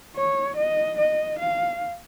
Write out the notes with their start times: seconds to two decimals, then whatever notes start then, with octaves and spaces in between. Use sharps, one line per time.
0.16 C#5
0.57 D#5
0.98 D#5
1.39 F5